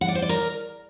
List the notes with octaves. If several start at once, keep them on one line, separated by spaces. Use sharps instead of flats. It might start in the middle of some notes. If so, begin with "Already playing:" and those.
F#5
D5
C5
D5
A#4